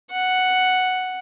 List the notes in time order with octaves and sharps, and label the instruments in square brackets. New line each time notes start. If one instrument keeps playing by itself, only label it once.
[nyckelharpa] F#5